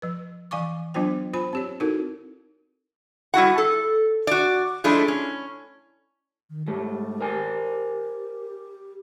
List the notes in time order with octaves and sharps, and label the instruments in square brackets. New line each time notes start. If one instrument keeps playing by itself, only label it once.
[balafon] F3 B4
E3 F5 G#5 C#6 D6
F#3 B3 D4 F4 C5 G5
F4 C5 G#5 B5
C4 G4 C#5
C4 D#4 E4 F#4 A4 A#4
[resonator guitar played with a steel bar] G3 E4 F#4 F#5
A4
F#4 D5
F3 G#3 A3 D4 E4
C#4
[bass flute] D#3
[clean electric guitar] G#2 A3 [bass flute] G4
[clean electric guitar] A#4 C5 G#5